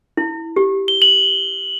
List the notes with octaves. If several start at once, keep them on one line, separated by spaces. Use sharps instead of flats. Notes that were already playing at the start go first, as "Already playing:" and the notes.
E4
G4
G7
F#7